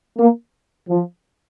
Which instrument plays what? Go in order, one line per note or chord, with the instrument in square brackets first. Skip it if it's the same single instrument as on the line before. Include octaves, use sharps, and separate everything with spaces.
[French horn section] A#3
F3